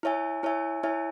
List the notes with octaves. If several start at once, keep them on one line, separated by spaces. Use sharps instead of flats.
E4 C#5 E5 G#5
E4 C#5 E5 G#5
E4 C#5 E5 G#5